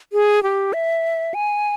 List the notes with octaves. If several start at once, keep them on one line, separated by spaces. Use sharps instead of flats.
G#4
G4
E5
G#5